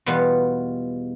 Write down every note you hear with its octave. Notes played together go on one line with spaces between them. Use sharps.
E2 B2 G3 B3 F4